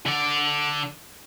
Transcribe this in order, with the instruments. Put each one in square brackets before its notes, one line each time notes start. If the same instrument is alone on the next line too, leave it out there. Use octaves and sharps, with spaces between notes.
[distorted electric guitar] D3 D5